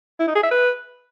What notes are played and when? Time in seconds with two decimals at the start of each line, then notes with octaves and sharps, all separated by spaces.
0.20 E4
0.27 D#4
0.35 G#4
0.43 E5
0.51 B4